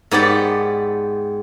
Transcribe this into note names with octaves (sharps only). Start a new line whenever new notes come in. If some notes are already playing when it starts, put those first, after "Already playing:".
G#2 B3 G4 D5